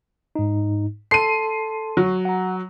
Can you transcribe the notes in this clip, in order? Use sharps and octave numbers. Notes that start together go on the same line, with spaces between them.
G#2 D#4
A4 A5 C6 C7 D#7
F#3 C#5 C#6
F#5 A#5